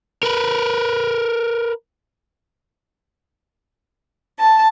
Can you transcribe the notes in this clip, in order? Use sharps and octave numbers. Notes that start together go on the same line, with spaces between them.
A#4 B4
A5